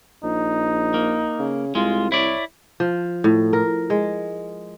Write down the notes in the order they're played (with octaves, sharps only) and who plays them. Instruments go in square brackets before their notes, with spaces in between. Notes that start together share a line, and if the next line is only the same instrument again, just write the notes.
[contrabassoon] A#1 [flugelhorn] D#4
[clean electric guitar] A#3
[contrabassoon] C#3
[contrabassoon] C2 [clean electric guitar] G#3 [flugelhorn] F4
[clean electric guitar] E4 D5 [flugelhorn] C#5
[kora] F3
A2
A#4
G#3